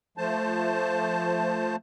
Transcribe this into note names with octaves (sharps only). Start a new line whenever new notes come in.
F3 A3 C5 A5